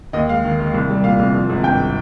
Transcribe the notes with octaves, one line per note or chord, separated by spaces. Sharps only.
D#2 D#5
G#3 F5
D#3
D#3
C2
G3
A#2 F5
C2
F3
G#1
G2 G5